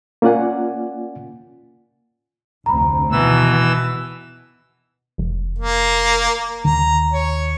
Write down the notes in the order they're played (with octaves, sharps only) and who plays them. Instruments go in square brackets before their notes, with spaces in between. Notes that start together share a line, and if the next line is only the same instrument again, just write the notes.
[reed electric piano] A#3 C#4 F4 D5 F#5 G#5
[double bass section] F1 D2 C4 [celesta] A#5 B5
[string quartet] B2 [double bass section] D#3 [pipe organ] E3 E6
[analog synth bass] F1
[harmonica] A#3
[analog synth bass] D#2 [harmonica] A#5
[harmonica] C#5